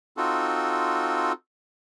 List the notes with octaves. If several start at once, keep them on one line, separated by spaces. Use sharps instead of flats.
C4 D#4 F4 F#4 A4